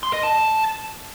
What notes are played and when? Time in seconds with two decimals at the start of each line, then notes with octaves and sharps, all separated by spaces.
0.03 C6
0.13 D#5
0.23 A5